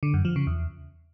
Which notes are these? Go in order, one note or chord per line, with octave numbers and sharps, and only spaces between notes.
D3
F#2
F3
C#3
E2